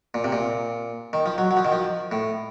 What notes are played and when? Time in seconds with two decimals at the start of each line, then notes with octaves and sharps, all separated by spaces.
0.14 A#2
0.24 C3
0.32 A#2
1.13 D#3
1.26 F3
1.38 F#3
1.51 F#3
1.57 F3
1.65 D#3
1.72 F3
2.11 A2